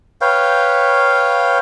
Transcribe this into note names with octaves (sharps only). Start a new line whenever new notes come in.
B4 C#5 F5 G5